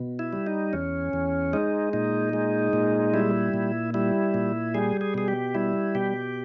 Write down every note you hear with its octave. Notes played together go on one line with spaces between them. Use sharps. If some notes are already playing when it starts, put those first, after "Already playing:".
Already playing: B2
E4
G3
D#4
E2 C#4
E2
G#3 D#4
A#2 D#4
G#3
A#2
G3 E4
A#2
G3 E4
A#2
G3 G#4
G#4
B2 G#4
G4
G3 E4
B2 G4